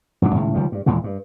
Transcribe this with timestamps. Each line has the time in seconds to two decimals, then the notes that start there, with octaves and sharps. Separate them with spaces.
0.22 F1 G#2 F#3 D4
0.34 C#2 A2 D#3 G#3
0.54 C#2 D#3 F3 G3
0.72 G2
0.86 D#2 A#2 E3 G#3
1.04 G2